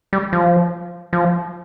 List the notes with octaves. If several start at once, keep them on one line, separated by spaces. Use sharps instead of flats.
G3
F3
F3